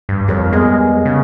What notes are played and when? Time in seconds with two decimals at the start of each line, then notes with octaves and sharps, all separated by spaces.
0.09 G2
0.28 F2 G3 A#4 C#5
0.53 G#3 B3 G#4 D#5
1.05 C#3